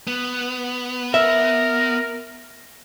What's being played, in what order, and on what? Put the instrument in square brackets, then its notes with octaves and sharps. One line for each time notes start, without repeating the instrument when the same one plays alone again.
[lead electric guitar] B3
[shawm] A#4 [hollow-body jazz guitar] E5